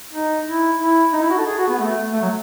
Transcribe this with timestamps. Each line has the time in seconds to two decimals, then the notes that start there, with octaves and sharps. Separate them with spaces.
0.13 D#4
0.46 E4
0.79 E4
1.13 D#4
1.22 E4
1.30 F#4
1.38 A4
1.47 G#4
1.58 F#4
1.69 B3
1.79 A3
2.14 A3
2.22 F#3